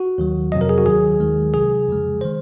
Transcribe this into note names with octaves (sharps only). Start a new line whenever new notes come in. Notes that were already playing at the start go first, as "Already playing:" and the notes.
Already playing: F#4
D#2 D#3 F#3
F2 C3 F#3 D#5
A#4
G#4
F#4
D#2 D#3 F#3 G#4
D#2 D#3 G#3
C2 C3 F#3 G#4
F2 C#3 F3 G#3
D#3 G#3 C5